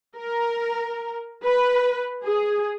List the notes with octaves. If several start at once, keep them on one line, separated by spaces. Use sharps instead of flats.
A#4
B4
G#4